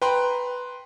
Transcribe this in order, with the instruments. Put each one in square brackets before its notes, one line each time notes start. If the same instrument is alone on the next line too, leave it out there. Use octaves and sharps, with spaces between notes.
[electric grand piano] B4 G5 A#5 C6 F#6